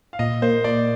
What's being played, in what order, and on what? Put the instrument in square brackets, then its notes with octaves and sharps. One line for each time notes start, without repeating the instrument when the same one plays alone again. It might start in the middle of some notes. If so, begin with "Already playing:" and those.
[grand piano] F5
[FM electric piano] A#2 [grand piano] D#5
[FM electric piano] A#3 [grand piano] C5
[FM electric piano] A#2 [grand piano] D5